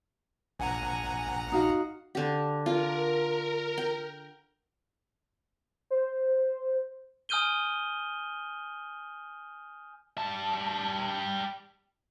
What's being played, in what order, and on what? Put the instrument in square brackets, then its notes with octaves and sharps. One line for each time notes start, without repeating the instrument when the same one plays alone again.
[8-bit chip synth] A#1 F#5 A#5 [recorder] G#5
[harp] D#4 F#4 F5
[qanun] D3 G4
[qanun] F4 [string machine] A#4
[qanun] G5
[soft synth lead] C5
[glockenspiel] G#5 D#6 F6 G6 D#7 G7
[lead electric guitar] G3 A5